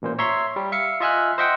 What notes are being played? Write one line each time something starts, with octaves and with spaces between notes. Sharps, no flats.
A1 A#2 C5
C#5 E5 A#5 C6
G3
E5 F5 C#7
F4 D#5 E5 G#5 F6 F#6
C5 D#5 E5 F#5 G5